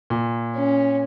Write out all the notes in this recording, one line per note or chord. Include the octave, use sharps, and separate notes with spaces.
A#2
C#4